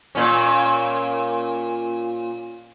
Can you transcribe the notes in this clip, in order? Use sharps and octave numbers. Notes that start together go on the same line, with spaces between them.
A#2 C#4